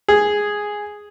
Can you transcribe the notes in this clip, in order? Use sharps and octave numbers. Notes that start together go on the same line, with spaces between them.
G#4